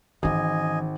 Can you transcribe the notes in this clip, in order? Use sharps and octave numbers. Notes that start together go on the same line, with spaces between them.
G#1 E3 C#4 D#5 G#5